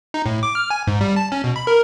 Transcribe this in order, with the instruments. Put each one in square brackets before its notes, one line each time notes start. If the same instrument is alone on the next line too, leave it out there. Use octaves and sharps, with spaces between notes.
[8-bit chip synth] D#4
A2
D6
F6
G#5
G#2
G3
A5
C#4
B2
B5
A#4